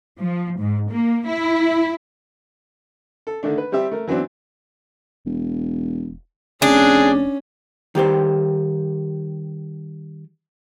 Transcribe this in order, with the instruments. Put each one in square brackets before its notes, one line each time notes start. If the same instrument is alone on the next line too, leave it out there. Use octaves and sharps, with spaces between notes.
[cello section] F3
G#2
A#3
E4
[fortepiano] A4
D3 D#3 A3 D4
B4
G3 C4 G4 E5
A3 A#4
E3 F#3 B3 C4 D4
[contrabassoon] E1
[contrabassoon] F1 [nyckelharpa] C#4 [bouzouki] D4 [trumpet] G#4
[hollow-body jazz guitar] D#3 G3 G4 C5